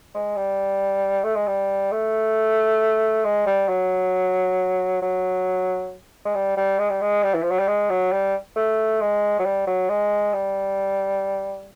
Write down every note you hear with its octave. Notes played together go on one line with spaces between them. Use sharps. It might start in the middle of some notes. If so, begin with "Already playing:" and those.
G#3
G3
A3
G#3
G3
A3
G#3
G3
F#3
F#3
G#3
G3
G3
G#3
G3
G#3
G3
E3
F3
F#3
G3
G#3
F#3
G3
A3
G#3
F#3
G3
F#3
G#3
G3